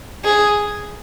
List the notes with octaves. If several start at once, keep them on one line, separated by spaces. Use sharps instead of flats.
G#4